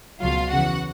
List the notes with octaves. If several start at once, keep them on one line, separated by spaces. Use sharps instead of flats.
C#2 B2 F#3 F4 F5
E2 C#3 E3 F#4 F#5